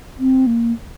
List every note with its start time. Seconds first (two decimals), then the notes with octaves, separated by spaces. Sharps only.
0.19 C4
0.46 A#3